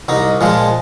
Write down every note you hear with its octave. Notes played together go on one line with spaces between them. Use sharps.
C2 D#4
A#2 F3 G#3